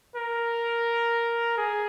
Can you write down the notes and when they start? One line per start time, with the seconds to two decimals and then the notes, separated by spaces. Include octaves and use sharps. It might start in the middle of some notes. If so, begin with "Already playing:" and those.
0.16 A#4
1.58 G#4